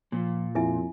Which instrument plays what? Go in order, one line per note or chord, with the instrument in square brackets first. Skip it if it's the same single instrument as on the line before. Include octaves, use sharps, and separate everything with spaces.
[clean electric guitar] A#2 [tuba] F3
[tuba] F2 [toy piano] E4 E5 G#5